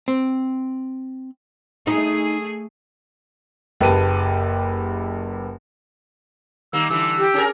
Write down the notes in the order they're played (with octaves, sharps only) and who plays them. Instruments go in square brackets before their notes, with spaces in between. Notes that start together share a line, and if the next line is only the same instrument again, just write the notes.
[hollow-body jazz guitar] C4
[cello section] A3 G#4 [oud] D#4
[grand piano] F#1 G4 B4 G5 A5 D#7
[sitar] D#3 G3 A#3 [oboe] E6
[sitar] D3 E3 G3 [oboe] E6
[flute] G4
[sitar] C#4 G#4 A#4